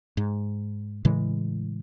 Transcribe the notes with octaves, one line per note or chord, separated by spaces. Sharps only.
G#2
A2 C#3 E3 G#3